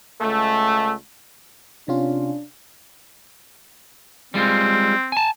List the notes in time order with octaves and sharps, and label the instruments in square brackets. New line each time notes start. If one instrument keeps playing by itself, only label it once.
[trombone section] C#2 A3
[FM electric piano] C3 C#4 F4 [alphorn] D4
[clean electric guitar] G3 G#3 F4 [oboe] C4
[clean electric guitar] G#5 A5